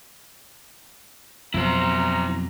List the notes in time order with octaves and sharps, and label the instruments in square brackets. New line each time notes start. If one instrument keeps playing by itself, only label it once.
[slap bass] F2 B2 F#3 [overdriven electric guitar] E4 C5 [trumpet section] A#5